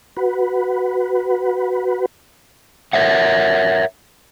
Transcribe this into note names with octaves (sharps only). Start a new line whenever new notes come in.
F#4 B4
A#4 C#5 E5 F#5